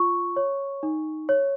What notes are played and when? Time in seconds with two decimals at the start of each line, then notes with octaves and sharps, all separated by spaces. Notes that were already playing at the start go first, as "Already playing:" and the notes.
Already playing: F4 C#6
0.36 C#5
0.83 D#4
1.29 C#5